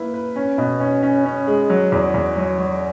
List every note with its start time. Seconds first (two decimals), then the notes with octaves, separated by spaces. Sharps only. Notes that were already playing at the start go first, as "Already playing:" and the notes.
Already playing: A#3 E4 B4
0.14 B4
0.36 C#4
0.58 B2
0.80 C#4
1.03 C#4
1.25 C#4
1.47 G#3
1.70 F#3
1.92 E2
2.14 E2
2.37 F#3
2.59 F#3